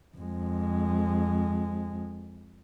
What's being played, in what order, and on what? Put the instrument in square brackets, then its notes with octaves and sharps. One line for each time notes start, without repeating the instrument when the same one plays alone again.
[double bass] F2 G#3